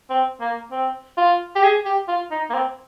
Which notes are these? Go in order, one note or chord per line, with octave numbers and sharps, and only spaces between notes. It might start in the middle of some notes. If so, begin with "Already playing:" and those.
C4
A#3
C4
F4
G4
G#4
G4
F4
D#4
A#3
C4